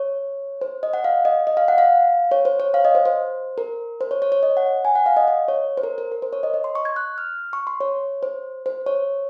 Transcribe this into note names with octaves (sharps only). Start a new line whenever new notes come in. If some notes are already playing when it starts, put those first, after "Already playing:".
Already playing: C#5
C5
D#5
F#5
F5
D#5
D#5
F5
F#5
F5
C#5
C5
C#5
F5
D#5
C5
C5
A#4
C5
C#5
C#5
C#5
D#5
F#5
G#5
F#5
F5
D#5
D#5
C#5
C5
A#4
A#4
A#4
C5
C#5
D#5
D#5
C6
C#6
G#6
F#6
F6
C#6
C6
C#5
C5
C5
C#5